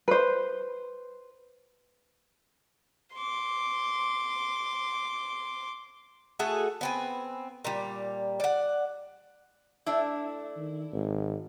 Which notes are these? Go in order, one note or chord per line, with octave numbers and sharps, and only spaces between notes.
B4 C5
C6 D6
A3 F#4 G#4 A4
B3 C4 G#5
A#2 G3
D5 F#5
A3 D4 E4
D#3
G#1